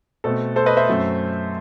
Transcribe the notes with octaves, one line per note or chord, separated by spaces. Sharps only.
B2 A3 C4 A4
A4 C5
B4 D#5
C5 E5
F#2 F#3 A3 C4